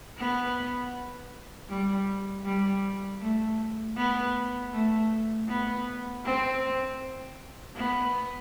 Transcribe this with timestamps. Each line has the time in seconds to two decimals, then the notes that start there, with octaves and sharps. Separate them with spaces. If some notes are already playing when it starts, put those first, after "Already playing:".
0.18 B3
1.69 G3
2.45 G3
3.21 A3
3.97 B3
4.73 A3
5.48 B3
6.25 C4
7.76 B3